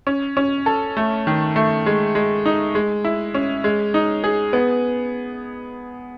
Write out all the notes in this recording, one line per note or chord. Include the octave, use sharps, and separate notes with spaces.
C#4
C#4
A4
A3
D#3
A3
G#3
G#3
D#4
G#3
E4
C#4
G#3
D#4
G#4
B3